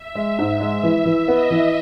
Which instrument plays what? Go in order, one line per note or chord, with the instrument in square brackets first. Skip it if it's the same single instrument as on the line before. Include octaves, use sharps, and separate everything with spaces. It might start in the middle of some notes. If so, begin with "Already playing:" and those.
Already playing: [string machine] E5
[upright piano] G#3
G#2
G#3
E3
E3
[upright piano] B3 [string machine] D#5
[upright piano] E3